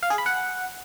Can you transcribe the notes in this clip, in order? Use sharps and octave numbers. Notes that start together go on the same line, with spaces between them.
F5
G#4
B5
F#5